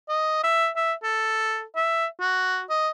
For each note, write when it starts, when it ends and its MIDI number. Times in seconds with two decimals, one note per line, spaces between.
0.09 0.43 75
0.44 0.69 76
0.76 0.93 76
1.03 1.62 69
1.76 2.06 76
2.20 2.63 66
2.70 2.90 75